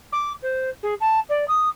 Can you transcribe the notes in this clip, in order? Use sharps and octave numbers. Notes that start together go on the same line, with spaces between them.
D6
C5
G#4
A5
D5
D#6